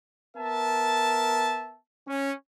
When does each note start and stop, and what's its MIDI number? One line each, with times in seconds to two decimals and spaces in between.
0.37 1.77 59
0.37 1.77 70
0.37 1.77 76
0.37 1.77 81
2.08 2.33 61